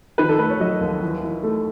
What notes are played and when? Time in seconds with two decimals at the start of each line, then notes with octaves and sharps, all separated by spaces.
0.18 D#3 B4
0.29 A4
0.39 A3 B4
0.50 C#5
0.60 F#3 D#5
0.81 D#2
1.03 E3
1.23 E4
1.43 A3